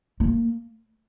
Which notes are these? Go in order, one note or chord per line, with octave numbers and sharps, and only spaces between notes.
A#3